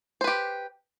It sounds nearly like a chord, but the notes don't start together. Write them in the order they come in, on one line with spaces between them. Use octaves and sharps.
C5 B4 G4